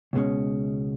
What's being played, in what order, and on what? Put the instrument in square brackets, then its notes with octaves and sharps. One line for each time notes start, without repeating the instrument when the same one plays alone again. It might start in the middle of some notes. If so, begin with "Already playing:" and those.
[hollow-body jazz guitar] C#2 B2 G#3 C#4